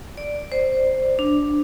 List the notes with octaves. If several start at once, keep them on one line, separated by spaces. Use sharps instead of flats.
D5
C5
D4